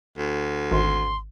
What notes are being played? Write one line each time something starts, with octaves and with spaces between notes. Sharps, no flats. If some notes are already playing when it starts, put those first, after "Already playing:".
D2
G#1 C6